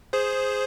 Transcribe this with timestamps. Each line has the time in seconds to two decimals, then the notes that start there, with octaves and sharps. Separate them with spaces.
0.13 G#4 C5